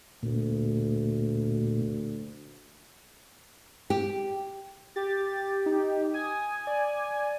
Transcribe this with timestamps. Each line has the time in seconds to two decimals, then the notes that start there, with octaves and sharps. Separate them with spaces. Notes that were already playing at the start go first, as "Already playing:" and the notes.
0.23 D2 A#2
3.90 G4
4.96 G4 A6
5.66 D#4
6.14 G#5 D#6
6.67 D5